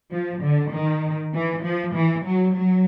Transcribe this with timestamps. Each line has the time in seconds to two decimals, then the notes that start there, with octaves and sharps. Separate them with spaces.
0.12 F3
0.43 D3
0.72 D#3
1.34 E3
1.63 F3
1.95 E3
2.25 F#3
2.55 F#3